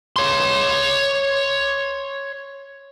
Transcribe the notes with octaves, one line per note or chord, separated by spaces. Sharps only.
C#5 C6